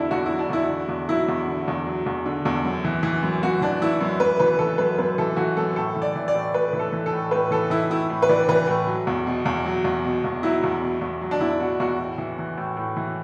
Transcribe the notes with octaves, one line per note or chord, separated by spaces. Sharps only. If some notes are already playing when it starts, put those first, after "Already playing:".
Already playing: E2 D3 F#3 D4 E4
E2 F#4
E4
F#3
D4
E2 E4
D3
E2
F#3 E4
E2
D3
E2
F#3
E2
D3
E2
F#2
E3
E3
F#2
F#2 F#4
E3 D4
E3 E4
F#2
F#2 B4
E3 B4
E3 A4
F#2 B4
F#2 B4
E3 A4
E3 F#4
F#2 A4
A2 A4
E3
D5
E3
D5
A2
A2 B4
E3
A4
E3
A4
A2
A2 B4
E3 A4
E3 E4
A2 E4
A2
B4
E3 D5
E3 B4
A2
F#3
E2
B2
E2
F#3
E2
B2
E2
F#3 E4
E2
B2
E2
F#3
D4
E2 E4
B2 F#4
E2 F#4
A2
E3
E3
A2
A2
E3